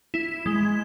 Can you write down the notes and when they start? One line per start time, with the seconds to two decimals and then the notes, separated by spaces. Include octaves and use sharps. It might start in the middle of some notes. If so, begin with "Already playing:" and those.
0.14 E4
0.46 G#3